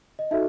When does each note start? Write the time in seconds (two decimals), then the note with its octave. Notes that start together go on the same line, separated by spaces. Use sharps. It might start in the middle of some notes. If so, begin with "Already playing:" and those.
0.19 D#5
0.31 D#4 F#4 A4 E5